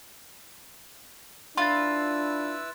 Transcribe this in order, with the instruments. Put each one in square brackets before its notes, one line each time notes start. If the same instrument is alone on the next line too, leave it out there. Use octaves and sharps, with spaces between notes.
[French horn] D4 [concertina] E4 B4 E6 [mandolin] F4 [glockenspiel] C6 A6